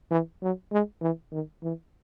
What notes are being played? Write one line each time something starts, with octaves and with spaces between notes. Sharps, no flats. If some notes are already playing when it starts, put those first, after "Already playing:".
E3
F#3
G#3
E3
D#3
E3